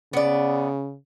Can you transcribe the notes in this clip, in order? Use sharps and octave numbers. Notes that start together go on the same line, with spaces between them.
C#3 B3 D5